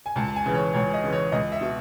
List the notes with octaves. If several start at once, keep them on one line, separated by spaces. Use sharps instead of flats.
G#5
C#2 A5
A5
G#5
C#3 E3
C#5
C#2 C#5
D#5
C#3 E3
C#5
C#2 D#5
E5
B2